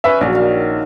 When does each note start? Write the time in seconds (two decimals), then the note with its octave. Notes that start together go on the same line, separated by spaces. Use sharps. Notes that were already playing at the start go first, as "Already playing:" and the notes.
0.04 C#4 B4 E5
0.21 A#1 F#3 D5
0.33 D#3 F5